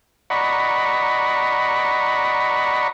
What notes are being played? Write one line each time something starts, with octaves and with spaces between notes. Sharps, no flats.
D5 D#5 F#5 A#5 B5 C#6